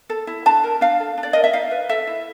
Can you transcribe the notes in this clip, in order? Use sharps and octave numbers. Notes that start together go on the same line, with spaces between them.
A4
E4
D4 A5
A#4
D4 F5
A4
D4
D5
A#4 D#5
E5
D#4 F5
B4
A4 E5
E4